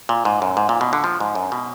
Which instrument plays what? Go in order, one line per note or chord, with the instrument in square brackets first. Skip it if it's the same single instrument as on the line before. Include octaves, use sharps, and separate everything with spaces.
[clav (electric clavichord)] A#2
G#2
F#2
G#2
A#2
B2
D3
F3
G#2
F#2
B2